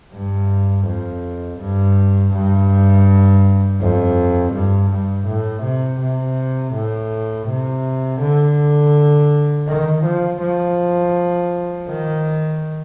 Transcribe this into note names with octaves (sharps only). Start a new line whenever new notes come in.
G2
F2
G2
G2
F2
G2
G2
A2
C3
C3
A2
C3
D3
D#3
F3
F3
D#3